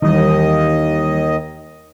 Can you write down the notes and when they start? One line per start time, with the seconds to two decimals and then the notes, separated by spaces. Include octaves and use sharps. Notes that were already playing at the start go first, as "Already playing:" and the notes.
0.02 D#2 D#3 E3 G3 D#5